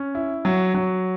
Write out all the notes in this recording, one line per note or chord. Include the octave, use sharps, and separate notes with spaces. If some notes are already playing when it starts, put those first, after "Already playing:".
Already playing: C#4
E4
F#3
F#3